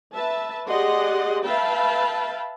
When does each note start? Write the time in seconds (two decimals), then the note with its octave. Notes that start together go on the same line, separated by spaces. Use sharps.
0.14 B4 E5 A5
0.67 G4 G#4 D5 D#5 F#5 C6
1.44 B4 E5 F5 G5 A5 B5